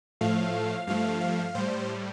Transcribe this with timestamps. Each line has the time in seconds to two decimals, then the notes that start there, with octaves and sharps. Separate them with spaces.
0.21 A2 F3 A3 F5
0.87 G2 F3 A3 F5
1.21 F5
1.55 A2 G3 C5